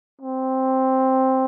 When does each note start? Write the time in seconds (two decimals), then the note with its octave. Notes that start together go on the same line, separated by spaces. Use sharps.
0.21 C4